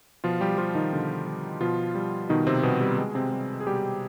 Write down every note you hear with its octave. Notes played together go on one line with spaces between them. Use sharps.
B2 F3 F4
G3 G4
F3 G3 F4
D#3 D#4
B2 D3 D4
G3
B2 F3 F4
G3
B2 D#3 D#4
C3 C4
B2 G3 B3
G3
B2 G#3
C3 C4
G3
G#4
B2 G3 G4